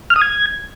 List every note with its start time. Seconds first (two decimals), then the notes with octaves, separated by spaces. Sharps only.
0.10 F6
0.16 D#6
0.21 G#6